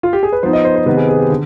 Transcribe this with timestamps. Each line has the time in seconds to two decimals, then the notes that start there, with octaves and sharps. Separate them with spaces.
0.03 F4
0.13 G4
0.23 G#4
0.33 B4
0.43 F3 B3 D#4 C5
0.53 D#5
0.65 C5
0.76 C5
0.86 C3 D#3 B3 B4
0.97 G#4
1.09 G#4
1.19 G4
1.30 D3